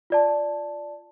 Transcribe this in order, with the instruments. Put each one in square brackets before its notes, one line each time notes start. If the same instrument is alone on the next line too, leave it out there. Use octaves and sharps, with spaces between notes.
[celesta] F4 D5 A5